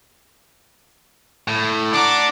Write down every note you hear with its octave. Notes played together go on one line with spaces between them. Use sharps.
A2
D4 F#5 A#5 D6